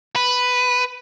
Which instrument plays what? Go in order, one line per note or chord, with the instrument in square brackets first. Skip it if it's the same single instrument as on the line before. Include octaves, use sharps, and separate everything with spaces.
[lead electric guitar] B4